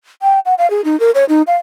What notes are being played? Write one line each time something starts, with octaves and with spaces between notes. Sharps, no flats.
G5
F#5
F5
G#4
D#4
A#4
C#5
D#4
F5